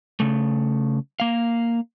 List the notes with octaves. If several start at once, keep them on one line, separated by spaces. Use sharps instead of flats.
C#3 A3
A#3 F5